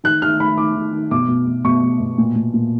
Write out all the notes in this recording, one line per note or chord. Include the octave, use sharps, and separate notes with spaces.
D#3 F#6
D#3 F6
D#3 B5
D#3 D6
D#3
D#3
B2 D6
B2
B2
B2 C#6
B2
B2
A#2
A#2
A#2